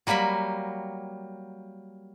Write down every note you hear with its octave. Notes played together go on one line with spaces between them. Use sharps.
F#3 G3 A#3 G4 B5